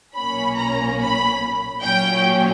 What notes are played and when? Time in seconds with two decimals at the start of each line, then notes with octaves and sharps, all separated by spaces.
0.15 B1 A#2 A#3 C#4 B5
0.57 A#5
0.99 B5
1.82 A#2 F#3 C#4 G5